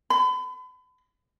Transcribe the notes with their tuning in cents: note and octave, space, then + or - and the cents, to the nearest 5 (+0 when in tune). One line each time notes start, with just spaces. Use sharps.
B5 +40